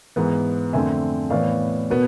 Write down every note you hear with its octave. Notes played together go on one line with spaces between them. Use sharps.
G#2 E3 B3
F2 D3 A3 C4 E5 G#5
A2 E3 B3 D5 F5
B2 B3